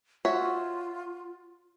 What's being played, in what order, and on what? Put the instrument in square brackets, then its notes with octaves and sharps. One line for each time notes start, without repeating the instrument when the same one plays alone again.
[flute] F4 [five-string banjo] F#4 C#5 E5